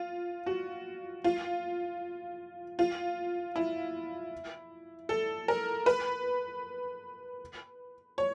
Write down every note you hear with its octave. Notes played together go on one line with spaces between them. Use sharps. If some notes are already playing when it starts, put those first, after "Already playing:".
Already playing: F4
F#4
F4
F4
E4
A4
A#4
B4
C#5